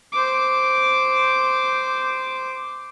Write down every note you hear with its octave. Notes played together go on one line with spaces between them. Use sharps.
C5 D6